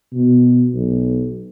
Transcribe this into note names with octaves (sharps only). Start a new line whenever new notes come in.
B2
B1